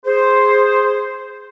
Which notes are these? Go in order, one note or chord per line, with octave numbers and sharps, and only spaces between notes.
G#4 C5